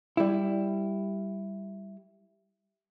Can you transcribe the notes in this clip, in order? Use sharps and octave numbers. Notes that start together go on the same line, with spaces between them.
G3 E4